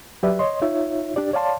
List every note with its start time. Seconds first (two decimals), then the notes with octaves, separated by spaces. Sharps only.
0.23 F#3 G4 B4 D5 E5
0.39 C#5 D#5 C6
0.62 D#4 F4 C#5 E5
1.16 D4 G4 D5
1.33 C#5 D5 F5 A5 C6